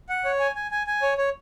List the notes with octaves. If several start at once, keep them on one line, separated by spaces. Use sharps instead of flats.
F#5
C#5
G#5
G#5
G#5
G#5
C#5
C#5